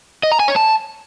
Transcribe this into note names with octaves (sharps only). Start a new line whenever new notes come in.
D#5
A#5
G#5
C#5
A5